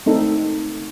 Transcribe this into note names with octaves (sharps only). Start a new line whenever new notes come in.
A3 C4 D#4 A4